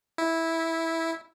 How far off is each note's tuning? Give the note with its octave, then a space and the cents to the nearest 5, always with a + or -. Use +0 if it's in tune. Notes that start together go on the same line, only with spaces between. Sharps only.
E4 -10